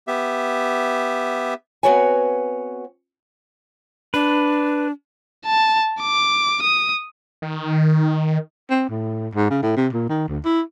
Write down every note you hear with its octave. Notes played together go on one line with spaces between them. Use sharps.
B3 G4 E5
B3 C4 F#4 B4 C#5 G#5
D4 B4
A5
D6
D#6
D#3
C4
A2
G#2
C#3
A2
C3
A#2
D#3
D2
E4